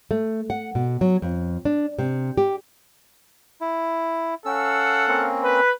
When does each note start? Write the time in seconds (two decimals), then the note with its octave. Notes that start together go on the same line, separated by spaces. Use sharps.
0.11 A3
0.50 F#5
0.75 B2
1.01 F#3
1.22 F2
1.65 D4
1.99 C3
2.38 G4
3.61 E4
4.46 C#4 A4 F5 F#5 E6
5.08 A#3 C4 C#4
5.42 B4